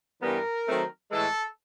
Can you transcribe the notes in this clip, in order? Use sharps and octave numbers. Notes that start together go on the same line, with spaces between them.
G2 E3 G3 B3 A#4
D#3 F#3 A3 C4
A2 E3 G#3 A4